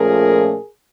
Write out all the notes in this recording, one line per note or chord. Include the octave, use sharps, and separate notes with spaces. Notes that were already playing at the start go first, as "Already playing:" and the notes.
Already playing: A#2 F3 A3 C#4 G#4 A#4